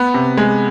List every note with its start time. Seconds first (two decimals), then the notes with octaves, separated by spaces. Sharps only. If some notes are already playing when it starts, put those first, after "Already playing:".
Already playing: B3
0.14 C3
0.37 G#3